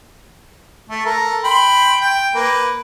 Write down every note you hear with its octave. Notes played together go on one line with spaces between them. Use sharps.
A3
A4 A#4
G5 B5 C6
G5
A#3 B4